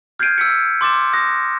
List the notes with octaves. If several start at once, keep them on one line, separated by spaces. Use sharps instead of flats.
F6 G6 G#6 C7 D7 D#7
E6 B6 C#7
C6 D6 A6 E7
D#6 F#6 A#6